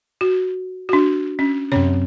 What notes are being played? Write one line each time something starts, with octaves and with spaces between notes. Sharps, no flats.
F#4
D4 F#4
C#4
F#2 C3 C#4 C#5